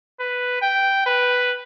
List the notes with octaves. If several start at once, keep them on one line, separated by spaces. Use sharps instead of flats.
B4
G5
B4